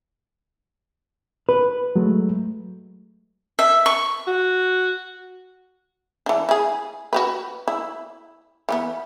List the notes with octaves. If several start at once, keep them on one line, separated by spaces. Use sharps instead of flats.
B4
F#3 G#3 A3
E5
C#6
F#4
E3 D4
E4 G#4
F#4 G4 B4
E4
E3 G3 B3